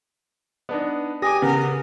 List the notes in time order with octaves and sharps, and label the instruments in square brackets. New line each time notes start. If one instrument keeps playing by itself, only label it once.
[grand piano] B3 D4 D#4
[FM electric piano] G4 D#6 [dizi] G#5 [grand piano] D6 A#6
[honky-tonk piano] C#3 B3 [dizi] A#4